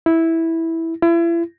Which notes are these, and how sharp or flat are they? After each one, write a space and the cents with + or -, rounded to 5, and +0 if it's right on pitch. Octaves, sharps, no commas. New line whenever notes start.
E4 -10
E4 +35